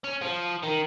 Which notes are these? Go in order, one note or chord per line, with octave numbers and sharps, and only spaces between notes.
C#4
F3
D#3